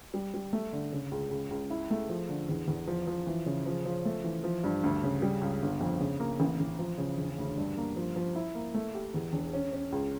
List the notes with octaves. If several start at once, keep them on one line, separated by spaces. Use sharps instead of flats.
G3
G3
A3
D3
C#3
C#2
C#2
C#2
E4
A3
F3
D3
E2
E2
F3
F3
E3
C#3
F3
F3
A3
E3
F3
G2
D2
C#3
G3
C#2
G1
F2
C#3
A#3
A1
A1
F3
C#3
E1
D2
G2
A#3
F3
F3
E4
A#3
A3
G4
E2
E1
C#4
C#4
C#2